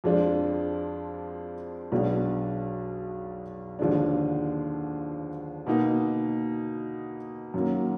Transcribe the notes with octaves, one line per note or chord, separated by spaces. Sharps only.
F2 F3 G#3 D4 F4
B1 B2 G#3 D4
D#2 D3 F3 G#3 D4
B2 A#3 D#4
F#2 D#3 F#3 A#3